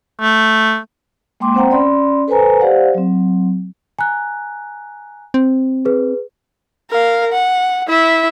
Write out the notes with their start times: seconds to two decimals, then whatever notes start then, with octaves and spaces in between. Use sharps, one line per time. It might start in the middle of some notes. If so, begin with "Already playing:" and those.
0.22 A3
1.40 G#3 A#3 G5 C6 D6
1.54 C4 C5 F#5 G5 A#5
1.70 C#4 D5 B5 C6
2.28 A4 B4 C5 G#5 A#5
2.61 G4 C5 D5 F5 F#5
2.94 F#3 C4
3.99 G#5 A#5 F#6
5.34 C4
5.85 G#4 B4
6.91 A#4 F5
7.32 F#5
7.88 E4 E5